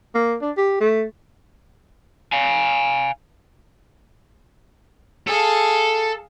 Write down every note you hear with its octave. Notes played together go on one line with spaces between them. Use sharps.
A#3
D4
G4
A3
F5 G#5
G#4 A4 F5